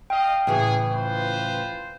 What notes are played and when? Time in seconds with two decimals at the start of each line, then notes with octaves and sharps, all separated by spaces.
0.10 D#5 F5 G5
0.47 A2 C#3 E3 G#4
0.91 F4 B4 C5